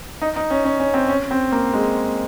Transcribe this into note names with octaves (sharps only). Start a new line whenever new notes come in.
D#4
D#4
C#4
C#4
C#4
C4
C#4
C4
A#3
G#3